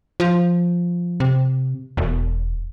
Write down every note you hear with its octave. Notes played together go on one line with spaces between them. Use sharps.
F3
C3
E1